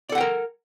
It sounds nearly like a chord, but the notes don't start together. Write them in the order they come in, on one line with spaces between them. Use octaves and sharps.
D5 A4 F#5 G5 A#4